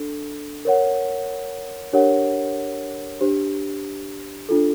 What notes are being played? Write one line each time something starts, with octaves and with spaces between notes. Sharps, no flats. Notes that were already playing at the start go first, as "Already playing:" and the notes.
Already playing: D4 A4
A#4 C#5 F#5
D4 G4 A#4 C#5 F#5
D4 G4 C5
D4 F4 A4